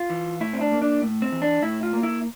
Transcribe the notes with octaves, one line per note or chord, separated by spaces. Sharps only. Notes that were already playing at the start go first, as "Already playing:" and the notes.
Already playing: F4
E3
A2 E4
C4
D4
A#3
D4
A2
C4
E3
D4
A2 E4
F4
A#3
E4